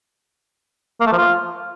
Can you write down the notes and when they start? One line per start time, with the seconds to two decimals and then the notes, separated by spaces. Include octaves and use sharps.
1.01 A#3
1.06 A3
1.12 F3
1.18 F4